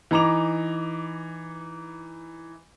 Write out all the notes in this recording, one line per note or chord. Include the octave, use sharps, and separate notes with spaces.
E3 D#4 A#5 D6 F7